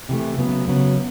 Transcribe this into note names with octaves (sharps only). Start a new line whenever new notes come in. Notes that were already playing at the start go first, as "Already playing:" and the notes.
C3 E3 A3
C#3 F#3 B3
C#3 F#3 B3